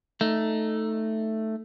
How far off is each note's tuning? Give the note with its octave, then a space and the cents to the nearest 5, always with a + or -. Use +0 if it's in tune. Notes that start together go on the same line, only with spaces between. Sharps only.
A3 +0 D#4 -5